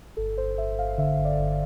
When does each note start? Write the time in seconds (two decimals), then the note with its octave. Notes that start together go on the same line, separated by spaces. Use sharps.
0.17 G1 A4
0.37 G1 C5
0.57 G1 E5
0.79 G1 F5
0.98 D3 E5
1.19 G1
1.25 D5
1.39 G1